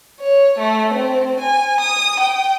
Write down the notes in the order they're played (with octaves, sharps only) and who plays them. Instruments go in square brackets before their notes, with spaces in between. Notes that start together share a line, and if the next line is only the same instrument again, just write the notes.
[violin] C#5
A3
C4
G#5
D#6
G5